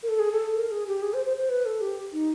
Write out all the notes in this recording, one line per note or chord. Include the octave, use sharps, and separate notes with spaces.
A#4
A4
G#4
A4
A#4
G#4
G4
G#4
C5
C5
C5
B4
A4
G4
D#4